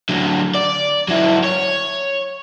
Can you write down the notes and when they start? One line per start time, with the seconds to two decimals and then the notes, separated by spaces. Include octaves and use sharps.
0.09 D3 F#3
0.54 D5
1.08 F#3 E4
1.44 C#5